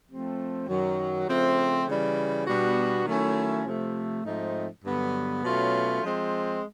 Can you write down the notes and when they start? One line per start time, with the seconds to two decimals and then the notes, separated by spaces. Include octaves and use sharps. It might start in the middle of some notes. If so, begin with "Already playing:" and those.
0.09 F3 A3 C4
0.68 F#2 D#3 F#3
1.28 C#3 F3 A3 C4
1.87 C#3 E3 G3
2.47 B2 G3 B3 D4 F#4
3.06 D#3 F#3 A3 C#4 E4
3.66 C3 F3 A3
4.25 G#2 F3 A3 C4 D#4
4.85 G2 D3 F#3 B3
5.44 B2 F#3 A3 C#4 F4
6.03 F3 G#3 C4